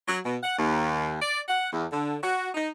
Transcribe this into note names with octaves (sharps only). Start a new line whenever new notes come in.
F#3
B2
F#5
D#2
D5
F#5
E2
D3
F#4
D#4